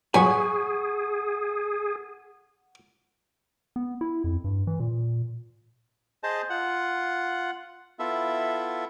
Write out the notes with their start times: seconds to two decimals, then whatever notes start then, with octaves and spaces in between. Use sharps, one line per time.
0.14 G2 F#3 G#4 F#5 G#5 B5 C#6
3.76 B3
4.01 E4
4.24 F2
4.44 G2
4.67 E3
4.80 A#2
6.23 G#4 C5 D#5 A5
6.50 F4 F#5
7.99 B3 E4 F4 A4 E5